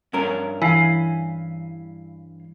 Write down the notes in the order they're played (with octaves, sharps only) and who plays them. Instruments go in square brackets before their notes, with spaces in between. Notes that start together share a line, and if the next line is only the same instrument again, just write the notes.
[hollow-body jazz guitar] G2 C#4 A#4
[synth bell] E3 E4 [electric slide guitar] F5 G#5